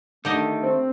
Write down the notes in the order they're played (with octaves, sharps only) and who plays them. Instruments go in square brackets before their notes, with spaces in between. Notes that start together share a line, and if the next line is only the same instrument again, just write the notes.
[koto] D3 G4 D#5 [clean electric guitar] D#3 [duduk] A3
[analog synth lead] C4